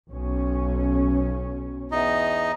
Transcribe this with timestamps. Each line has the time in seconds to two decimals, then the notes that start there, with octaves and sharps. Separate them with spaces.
0.11 B1 C#4
1.92 E2 D#4 D#5